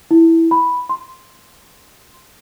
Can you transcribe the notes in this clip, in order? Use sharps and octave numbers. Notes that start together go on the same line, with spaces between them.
E4
B5
C6